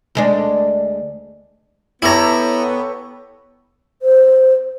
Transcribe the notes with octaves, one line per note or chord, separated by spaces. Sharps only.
D2 G#3 D4
B3 E4 G4 A4 C#5 A#5
C5